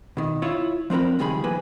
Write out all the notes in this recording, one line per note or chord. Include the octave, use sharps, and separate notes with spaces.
B2 D#3
E4 F4 C#5
F3 C4 D4 A#4 B5
C#2 G2 D#3 G#4 B5
F3 A#3 G#4 B4